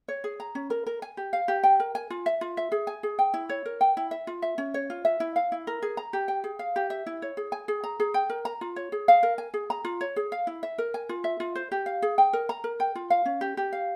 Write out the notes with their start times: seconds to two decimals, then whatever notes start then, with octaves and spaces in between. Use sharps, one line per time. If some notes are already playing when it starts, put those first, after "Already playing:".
0.08 C#5
0.24 G#4
0.40 A#5
0.55 C#4
0.70 A#4
0.86 A#4
1.02 G#5
1.17 G4
1.33 F5
1.48 G4
1.63 G5
1.80 A#4
1.95 G#5
2.10 F4
2.26 E5
2.41 F4
2.57 E5
2.72 G#4
2.87 G#5
3.03 G#4
3.19 G5
3.34 E4
3.49 C#5
3.65 A#4
3.81 G5
3.97 E4
4.11 E5
4.27 F4
4.42 E5
4.58 C#4
4.74 C#5
4.90 F4
5.05 E5
5.20 E4
5.36 F5
5.52 E4
5.67 A#4
5.82 G#4
5.97 A#5
6.13 G4
6.28 G5
6.44 G#4
6.59 F5
6.76 G4
6.90 E5
7.06 E4
7.22 C#5
7.37 G#4
7.52 G#5
7.68 G#4
7.84 A#5
8.00 G#4
8.14 G5
8.30 A#4
8.45 A#5
8.61 F4
8.76 C#5
8.92 G#4
9.08 F5
9.23 A#4
9.38 G#5
9.54 G#4
9.70 A#5
9.85 F4
10.01 C#5
10.16 G#4
10.32 F5
10.47 E4
10.63 E5
10.78 A#4
10.94 G#5
11.09 F4
11.24 E5
11.40 F4
11.55 C5
11.72 G4
11.86 F5
12.02 G#4
12.18 G5
12.33 A#4
12.49 A#5
12.64 A#4
12.80 G5
12.95 F4
13.10 F5
13.25 C#4
13.41 G4
13.57 G4
13.73 F5